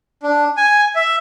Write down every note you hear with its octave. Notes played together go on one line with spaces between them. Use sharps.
D4
G#5
E5